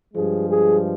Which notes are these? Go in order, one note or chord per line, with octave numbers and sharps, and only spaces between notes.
G2 F3 G#3 G#4
G#4